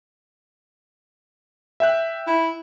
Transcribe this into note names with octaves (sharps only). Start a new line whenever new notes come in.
E5 G5 F#6
E4